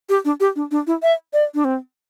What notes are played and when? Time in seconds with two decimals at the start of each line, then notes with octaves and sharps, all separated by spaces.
0.09 G4
0.25 D4
0.40 G4
0.56 D4
0.71 D4
0.87 E4
1.03 E5
1.33 D5
1.54 D4
1.65 C4